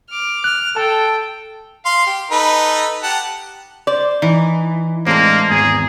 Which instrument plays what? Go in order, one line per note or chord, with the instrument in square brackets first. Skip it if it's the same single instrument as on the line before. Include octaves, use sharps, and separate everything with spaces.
[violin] D6 F6
[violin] F6 [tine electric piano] F#6
[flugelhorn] A4 [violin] G5 [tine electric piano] A5
[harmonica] F5 C6
G4
D#4 A4 B4
G4 F#5 A5
[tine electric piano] C5 [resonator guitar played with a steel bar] D5
[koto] E3 [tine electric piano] D#4
[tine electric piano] A2 G#3 D4 [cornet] A#3 [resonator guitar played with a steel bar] C4 C5
[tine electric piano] G#1 E2 A#5 [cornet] G#4